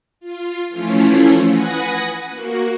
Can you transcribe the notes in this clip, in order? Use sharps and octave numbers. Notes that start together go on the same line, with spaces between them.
F4
E3 F3 A3 C#4 E4 F4
B4 F#5 G#5 D#6 A#6
A#3 F#4